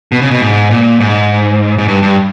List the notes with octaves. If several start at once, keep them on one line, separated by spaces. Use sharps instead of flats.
B2
C#3
B2
G#2
A#2
G#2
G#2
G2
G2